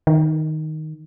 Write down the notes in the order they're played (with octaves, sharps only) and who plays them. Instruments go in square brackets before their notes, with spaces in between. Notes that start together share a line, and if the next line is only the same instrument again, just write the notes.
[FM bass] D#3